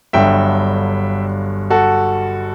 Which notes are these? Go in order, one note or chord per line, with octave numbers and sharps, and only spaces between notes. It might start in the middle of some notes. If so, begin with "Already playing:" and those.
G1 G2 D3 F#3 E5 G5
F#4 A4